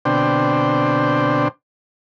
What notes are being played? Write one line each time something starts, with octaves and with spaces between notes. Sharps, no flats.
B2 D3 C4 D4 C5 G5